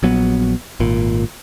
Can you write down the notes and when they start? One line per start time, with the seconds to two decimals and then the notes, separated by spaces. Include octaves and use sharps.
0.03 A#1 F#3 B3
0.80 G#1 A#2